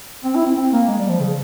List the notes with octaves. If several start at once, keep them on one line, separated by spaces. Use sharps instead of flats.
C4
E4
C4
C4
A#3
G#3
G3
F3
C#3